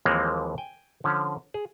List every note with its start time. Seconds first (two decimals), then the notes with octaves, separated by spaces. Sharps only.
0.05 D#2 E3 F3 G#3 A#3 C4
0.58 G5 G#5
1.04 D3 F3 C#4
1.54 G#4